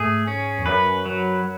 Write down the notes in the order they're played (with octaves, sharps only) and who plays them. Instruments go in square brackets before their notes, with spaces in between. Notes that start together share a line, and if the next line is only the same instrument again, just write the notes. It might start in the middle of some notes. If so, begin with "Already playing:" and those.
Already playing: [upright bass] G#2 [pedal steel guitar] A3 G#4
[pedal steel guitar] C#4
[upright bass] E2
[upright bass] F#2 [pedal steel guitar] B4
[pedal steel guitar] F#3